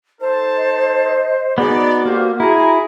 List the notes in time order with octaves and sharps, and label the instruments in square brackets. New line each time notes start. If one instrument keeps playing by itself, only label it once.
[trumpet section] D#4 A4 A5 [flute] C5
[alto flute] D#5
[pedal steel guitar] B3 D#4 [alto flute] F#4 [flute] G#4 [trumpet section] D5
[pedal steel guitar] A#3 [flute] G4 [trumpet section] A4 C5
[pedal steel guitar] E4 [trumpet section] G#4 [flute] A#5